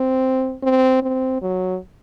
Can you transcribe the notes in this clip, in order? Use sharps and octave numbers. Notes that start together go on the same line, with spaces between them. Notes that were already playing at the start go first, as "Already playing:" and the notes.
Already playing: C4
C4
C4
F#3